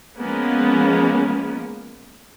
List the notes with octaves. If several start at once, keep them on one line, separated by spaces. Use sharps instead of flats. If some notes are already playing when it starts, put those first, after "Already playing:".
F3 G#3 A#3 B3 C#4